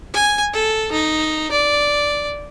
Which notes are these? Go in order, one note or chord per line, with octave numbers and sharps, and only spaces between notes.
G#5
A4
D#4
D5